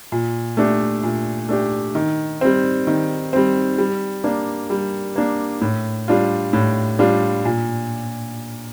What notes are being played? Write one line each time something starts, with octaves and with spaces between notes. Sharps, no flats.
A#2
A3 D4 G4
A#2
A3 D4 G4
D#3
G3 C4
D#3
G3 C4
G3
A#3 D4
G3
A#3 D4
A2
G3 D4 F4
A2
G3 D4 F4
A#2